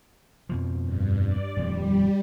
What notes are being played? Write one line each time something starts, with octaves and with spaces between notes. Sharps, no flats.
F2 B2 F3
G2
D5
D#1 F2 F3 G3